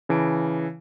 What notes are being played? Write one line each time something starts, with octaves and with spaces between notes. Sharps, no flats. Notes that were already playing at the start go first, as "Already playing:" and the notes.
C#3 E3 A5 D7